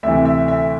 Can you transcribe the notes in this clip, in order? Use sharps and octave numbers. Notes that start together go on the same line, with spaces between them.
D2 C3 E3 E5
E5
E5